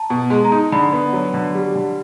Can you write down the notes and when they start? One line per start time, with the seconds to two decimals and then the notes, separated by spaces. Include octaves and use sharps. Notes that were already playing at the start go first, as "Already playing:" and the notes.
Already playing: A5 A#5
0.10 B2
0.30 G#3
0.45 A#5
0.52 D#4
0.72 D3 B5
0.93 B3
1.13 F#3
1.34 D3
1.55 G3
1.76 D3